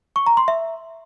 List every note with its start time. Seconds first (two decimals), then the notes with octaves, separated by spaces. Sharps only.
0.16 C#6
0.26 A#5
0.37 C6
0.48 E5